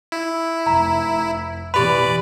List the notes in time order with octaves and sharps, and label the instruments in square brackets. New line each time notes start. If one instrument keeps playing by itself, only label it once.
[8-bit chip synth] E4
[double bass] F1 [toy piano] A#5
[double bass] B2 E3 [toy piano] G4 B5 [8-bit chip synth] B4 D5